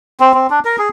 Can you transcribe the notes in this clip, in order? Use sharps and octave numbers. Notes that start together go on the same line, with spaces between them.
C4
C4
D4
A#4
G#4